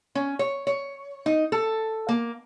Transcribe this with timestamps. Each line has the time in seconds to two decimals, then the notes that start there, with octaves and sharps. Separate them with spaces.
0.15 C#4
0.39 C#5
0.67 C#5
1.26 D#4
1.52 A4
2.09 A#3